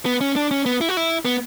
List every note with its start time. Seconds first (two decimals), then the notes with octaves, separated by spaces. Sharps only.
0.06 B3
0.21 C#4
0.36 D4
0.51 C#4
0.66 B3
0.81 E4
0.89 F#4
0.97 E4
1.25 B3